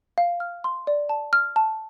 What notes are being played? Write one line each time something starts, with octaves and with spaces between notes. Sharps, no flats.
F5
F6
C6
D5
A5
F6
A5